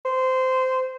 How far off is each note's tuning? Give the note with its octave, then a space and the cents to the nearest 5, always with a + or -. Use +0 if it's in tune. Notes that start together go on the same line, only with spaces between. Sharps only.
C5 -15